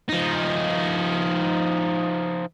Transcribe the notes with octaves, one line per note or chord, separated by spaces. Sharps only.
F3 D#4